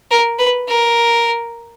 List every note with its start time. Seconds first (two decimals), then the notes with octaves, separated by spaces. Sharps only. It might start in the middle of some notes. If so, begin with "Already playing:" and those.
0.11 A#4
0.39 B4
0.68 A#4